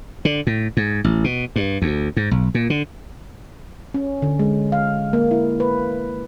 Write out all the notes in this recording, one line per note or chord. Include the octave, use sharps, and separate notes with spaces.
D3
A2
G#2
A1
B2
G2
D2
G#2
B1
A#2
D3
C#4
D3
G#3
F5
A#3
E4
B4